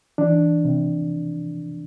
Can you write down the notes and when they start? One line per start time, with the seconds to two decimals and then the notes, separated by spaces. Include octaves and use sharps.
0.18 E3 D4
0.65 C3